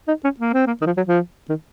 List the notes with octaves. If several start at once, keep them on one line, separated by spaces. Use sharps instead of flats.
D#4
C#4
A#3
C4
A#3
D#3
F3
F#3
F3
D#3